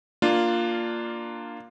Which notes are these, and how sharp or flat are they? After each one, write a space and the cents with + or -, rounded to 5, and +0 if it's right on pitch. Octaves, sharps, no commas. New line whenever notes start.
A#3 +0 D4 +15 F4 +0